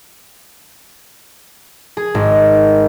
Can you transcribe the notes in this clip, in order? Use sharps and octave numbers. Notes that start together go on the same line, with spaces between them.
G#4
G#1